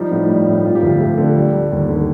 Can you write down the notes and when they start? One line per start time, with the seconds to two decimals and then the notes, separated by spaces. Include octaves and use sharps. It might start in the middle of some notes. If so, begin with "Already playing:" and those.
Already playing: F3 G3 D#4 G4
0.11 A2
0.29 G3
0.47 A2
0.65 F3 F4
0.75 G4
0.82 D2 F4
1.00 A3
1.18 D3
1.36 G3
1.53 G3
1.71 D#2
1.89 D3